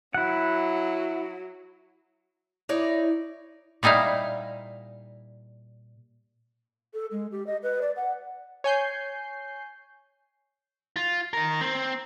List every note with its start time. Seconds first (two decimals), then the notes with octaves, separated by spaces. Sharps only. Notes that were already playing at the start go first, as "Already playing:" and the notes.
0.14 F#3 E4 F#5
2.69 D#4 E4 C#5 D5
3.83 A#2 G3 D#4 E4 F5
6.94 A4
7.11 G#3
7.32 G4
7.47 D#5
7.63 B4
7.81 D5
7.96 F#5
8.64 C#5 G#5 G6 C7
10.96 F4
11.33 D#4 A#4
11.61 C4